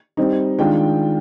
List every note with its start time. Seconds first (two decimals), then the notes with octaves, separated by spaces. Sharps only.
0.17 G3 C4 D#4
0.58 D#3 G#3 D4 F4 G5